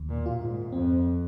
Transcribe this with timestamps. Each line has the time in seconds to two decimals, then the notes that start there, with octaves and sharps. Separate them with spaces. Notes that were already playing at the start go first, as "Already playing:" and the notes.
Already playing: D#2
0.10 A#2
0.26 F4
0.41 G#2
0.72 F2 C4